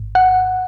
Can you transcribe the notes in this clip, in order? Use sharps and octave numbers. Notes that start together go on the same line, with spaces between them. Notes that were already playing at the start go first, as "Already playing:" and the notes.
Already playing: G#1 G#2
F#5